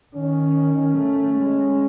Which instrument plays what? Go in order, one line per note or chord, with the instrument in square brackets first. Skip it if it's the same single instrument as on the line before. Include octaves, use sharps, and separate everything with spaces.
[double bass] D#3 [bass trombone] C#4
[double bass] A3
G#3